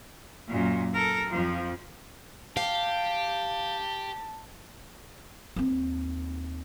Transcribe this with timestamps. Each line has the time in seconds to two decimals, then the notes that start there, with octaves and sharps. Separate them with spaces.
0.48 F#2 A#2
0.93 A4 A#4
1.29 F2 F3
2.57 G4 F5 A5
5.56 D#2 C4